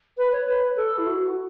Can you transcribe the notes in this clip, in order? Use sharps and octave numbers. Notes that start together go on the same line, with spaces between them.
B4
C#5
B4
A4
E4
F#4